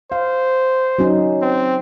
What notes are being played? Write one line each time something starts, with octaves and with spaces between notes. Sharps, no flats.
C5 F5
F#3 C#4 D#4
C4